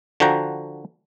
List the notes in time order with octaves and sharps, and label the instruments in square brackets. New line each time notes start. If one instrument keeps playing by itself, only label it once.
[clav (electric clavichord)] D3 F3 F#4 G5 A#5